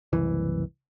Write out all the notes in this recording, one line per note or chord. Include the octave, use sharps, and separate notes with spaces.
F#1 C2 E3